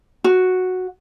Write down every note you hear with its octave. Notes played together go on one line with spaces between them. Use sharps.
F#4